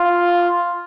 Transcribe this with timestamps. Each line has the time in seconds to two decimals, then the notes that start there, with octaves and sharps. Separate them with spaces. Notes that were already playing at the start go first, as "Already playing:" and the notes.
Already playing: F4